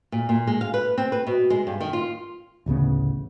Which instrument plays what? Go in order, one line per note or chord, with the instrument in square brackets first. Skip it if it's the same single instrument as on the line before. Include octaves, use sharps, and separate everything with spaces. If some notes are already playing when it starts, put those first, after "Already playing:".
[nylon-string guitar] A#2
A#2
G#3
F5
B4
C4
B4
B2
G#3
G2
D#3
F4
[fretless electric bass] A1 D2 C#3 B3